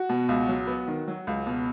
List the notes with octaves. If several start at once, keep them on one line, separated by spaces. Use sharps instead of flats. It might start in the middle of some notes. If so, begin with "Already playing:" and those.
Already playing: F#4
B2
C#2
F#3
B3
D#3
F#3
C#2
B2